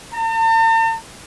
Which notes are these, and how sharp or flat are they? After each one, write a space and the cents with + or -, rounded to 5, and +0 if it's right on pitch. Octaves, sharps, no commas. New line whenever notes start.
A5 +45